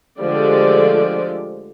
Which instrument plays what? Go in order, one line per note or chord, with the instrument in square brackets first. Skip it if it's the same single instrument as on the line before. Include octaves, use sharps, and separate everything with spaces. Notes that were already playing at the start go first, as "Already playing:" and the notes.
[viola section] D3 F3 G#3 A3 G4 D5